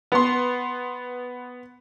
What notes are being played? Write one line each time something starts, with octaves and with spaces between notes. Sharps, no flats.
B3 C6